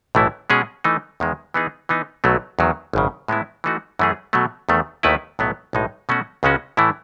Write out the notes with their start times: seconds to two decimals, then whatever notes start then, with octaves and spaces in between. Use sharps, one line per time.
0.15 B1 A2 E3 A3 E4
0.50 B2 G#3 C#4 G#4
0.84 E3 A3 D#4
1.20 E2 D#3 G#3
1.54 E3 B3 D#4 G#4
1.89 E3 B3 D#4
2.24 B1 B2 F#3 A3
2.59 E2 D#3 F#3
2.93 G#1 F#2 C#3
3.28 A2 G#3 B3 E4
3.64 E3 A3 D#4 F#4
3.99 F#2 E3 A3 C#4 G#4
4.33 B2 F#3 A3
4.69 E2 D#3 A3
5.03 D#2 D#3 A3 E4 B4
5.39 B1 A2 F#3 B3
5.73 B1 A2 G#3 D#4
6.09 B2 A3 C#4 F#4
6.43 C#2 C#3 G#3 C#4 F#4
6.77 A2 E3 A3 E4